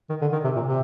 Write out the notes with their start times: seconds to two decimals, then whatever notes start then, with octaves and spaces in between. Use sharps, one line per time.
0.10 D#3
0.21 D3
0.32 D#3
0.44 C3
0.56 A#2
0.67 C3